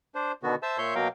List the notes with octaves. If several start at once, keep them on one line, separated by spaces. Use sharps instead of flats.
D4 C5
B2 D3 D#3 B3 F#4
C5 E5 A5 E6
A#2 C#5 E5 C6 G6
B2 F#3 A#3 A#4 F5 G5